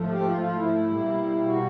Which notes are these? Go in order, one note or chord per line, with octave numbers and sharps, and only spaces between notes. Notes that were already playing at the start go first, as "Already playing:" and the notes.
Already playing: G#2 F3 A3
G4
F4
F4
E4
B2 G3 A#3
F#4